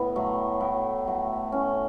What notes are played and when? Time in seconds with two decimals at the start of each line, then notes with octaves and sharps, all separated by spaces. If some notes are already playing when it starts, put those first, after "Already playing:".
Already playing: A2 B3
0.16 F#3 A3
0.61 A2
1.06 F#3 A3
1.52 A2 C#4